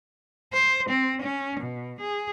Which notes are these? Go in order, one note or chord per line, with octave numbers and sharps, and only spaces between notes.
C5
C4
C#4
B2
G#4